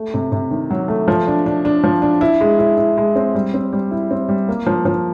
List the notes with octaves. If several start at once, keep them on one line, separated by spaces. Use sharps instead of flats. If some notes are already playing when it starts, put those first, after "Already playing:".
Already playing: A3
C3
C3
D#3
F#3
A3
F3
D4
D4
D4
F3
D4
E4
G#3
E4
E4
G#3
C4
G3
C4
G3
E4
C4
G3
A#3
F3
F3